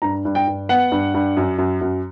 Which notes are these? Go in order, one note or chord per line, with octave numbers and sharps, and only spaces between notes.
G2 A#5
G2
G5
G2
B3 F#5
G2
G2
F#2
F#2
F#2